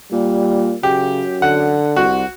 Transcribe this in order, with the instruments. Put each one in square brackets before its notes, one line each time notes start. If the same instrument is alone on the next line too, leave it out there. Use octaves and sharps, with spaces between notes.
[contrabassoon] A#2 [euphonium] G3
[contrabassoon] F#2 [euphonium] C#3 [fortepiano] G4
[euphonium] D3 [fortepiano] F#5
[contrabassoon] C2 [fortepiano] F#4